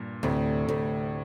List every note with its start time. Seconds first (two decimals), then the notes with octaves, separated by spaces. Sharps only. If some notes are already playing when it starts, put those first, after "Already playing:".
Already playing: G2 A#2
0.23 D2 A2 C3
0.69 D2